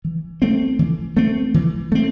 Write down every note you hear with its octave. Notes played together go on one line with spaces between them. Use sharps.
E3
A3 C4
E3
A3 C4
E3
A3 C4